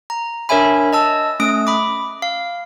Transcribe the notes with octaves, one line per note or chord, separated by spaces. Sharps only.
A#5
D4 A#4 C#5 E5 G#5 B5
D#5 A5 E6
A3 C#4 D#6 D7
B5 D6
F5